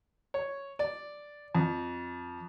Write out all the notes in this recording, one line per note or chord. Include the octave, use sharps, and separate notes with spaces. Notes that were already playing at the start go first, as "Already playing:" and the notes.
C#5
D5
F2